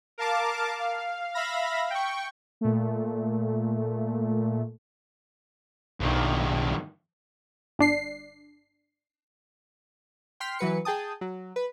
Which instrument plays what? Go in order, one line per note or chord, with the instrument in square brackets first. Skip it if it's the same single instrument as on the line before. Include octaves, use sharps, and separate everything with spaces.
[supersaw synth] A#4 F5 A5 D6
F5
E5 F5 B5 A#6
G5 C#6
[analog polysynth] A#2 A3
[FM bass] B1 [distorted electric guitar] G2 D#3
[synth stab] G1 D4 C7
[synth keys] G5 C6 F6 B6 C7
E3 F#3 B4 C#7
G#4 G5 A5 D#6
F#3
B4